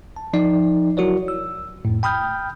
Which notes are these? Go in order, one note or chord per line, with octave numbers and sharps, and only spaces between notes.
A5
F3 D#4 D5
F#3 E4 F#4 A#4 C#5 D5
E6
F2 A2
G5 B5 D#6 F6 G6